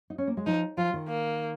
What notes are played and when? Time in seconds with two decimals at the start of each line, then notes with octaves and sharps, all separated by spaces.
0.10 D#4
0.18 C#4
0.27 A#3
0.37 G#3
0.46 F3 D#4
0.77 F3 F4
0.94 D#3
1.08 A#3